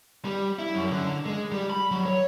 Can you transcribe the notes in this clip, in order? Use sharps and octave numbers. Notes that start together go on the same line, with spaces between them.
G3
E4
F#2
D3
G#3
G3
B5
F#3
C#5